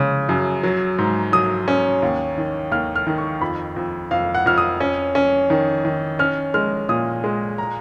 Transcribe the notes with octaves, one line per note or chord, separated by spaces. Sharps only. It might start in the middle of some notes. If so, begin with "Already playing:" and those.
Already playing: C#3 G#3 C#4
F#2
F#3
G#2
F#3 D#6
C#4
D#2
D#3
D#2 F6
F6
D#3
C#6
F2 B5
F2
F2 F5
F#5
F2 F6
D#6
C#4
C#4
D#3
D#3
C#4 F6
G#3 F6
A#2 D#6
G#3
A#5